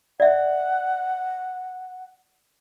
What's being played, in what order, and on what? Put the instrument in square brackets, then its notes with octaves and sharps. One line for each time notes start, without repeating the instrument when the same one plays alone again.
[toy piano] D5 E5 [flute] F#5